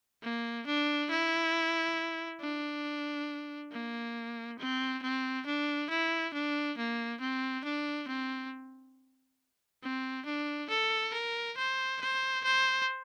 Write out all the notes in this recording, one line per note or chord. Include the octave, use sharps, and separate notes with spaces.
A#3
D4
E4
D4
A#3
C4
C4
D4
E4
D4
A#3
C4
D4
C4
C4
D4
A4
A#4
C5
C5
C5